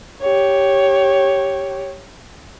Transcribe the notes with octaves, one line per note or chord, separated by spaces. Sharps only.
G4 C#5